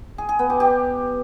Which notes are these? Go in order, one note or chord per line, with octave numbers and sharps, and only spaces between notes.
G#4
G#4
B3
G4
G4